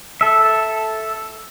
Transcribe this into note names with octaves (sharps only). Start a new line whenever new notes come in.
A4 E5